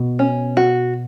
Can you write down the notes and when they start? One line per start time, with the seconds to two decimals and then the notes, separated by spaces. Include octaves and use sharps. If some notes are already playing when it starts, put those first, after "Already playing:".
Already playing: B2
0.19 C#4
0.57 F#4